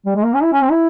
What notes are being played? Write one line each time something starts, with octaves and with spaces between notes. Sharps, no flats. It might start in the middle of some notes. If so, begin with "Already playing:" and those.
G3
G#3
A#3
C#4
E4
C#4
C4
E4